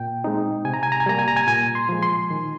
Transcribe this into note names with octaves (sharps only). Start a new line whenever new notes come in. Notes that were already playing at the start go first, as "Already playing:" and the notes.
Already playing: A#2 G5
G#3 C4 D#4
C3 G#5
A#5
G#5
A#5
G#5
G3 A#3 A#5
G#5
A#5
G#5
A#2 G#5
C6
F3 G#3
C6
D#3